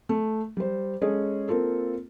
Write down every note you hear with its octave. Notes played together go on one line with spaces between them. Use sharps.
A3
G3 C5
G#3 C#4 G#4 A4 D#5
A#3 C4 F4 A4 A#4